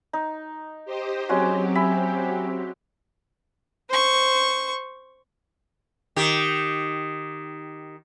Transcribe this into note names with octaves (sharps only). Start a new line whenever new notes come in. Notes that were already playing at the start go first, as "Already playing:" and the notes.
D#4
G4 C5 D#5
F#3 G#3 C4 C#4 F#4 G4
E5 G#5 B5
C5 C#6
D#3 G4